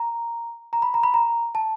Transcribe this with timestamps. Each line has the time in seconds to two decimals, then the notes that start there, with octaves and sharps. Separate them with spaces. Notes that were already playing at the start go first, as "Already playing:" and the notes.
Already playing: A#5
0.73 A#5
0.82 B5
0.94 A#5
1.03 B5
1.14 A#5
1.55 A5